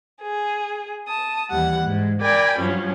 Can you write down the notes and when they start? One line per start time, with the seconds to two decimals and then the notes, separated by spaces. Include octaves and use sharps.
0.21 G#4
1.07 A5 D#6
1.51 D#2 E3 G3 F#5
1.84 G#2
2.21 A#4 D5 G5 G#5 B5
2.59 G2 F3 F#3 C#4